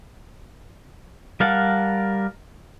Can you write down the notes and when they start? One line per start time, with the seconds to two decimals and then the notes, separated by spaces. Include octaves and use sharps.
1.40 G3 A#4 F5 F#5 A5